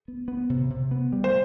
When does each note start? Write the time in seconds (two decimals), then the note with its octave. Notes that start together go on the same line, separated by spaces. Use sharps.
0.08 B3
0.28 B3
0.50 C3
0.70 C3
0.91 B3
1.13 G3
1.24 C5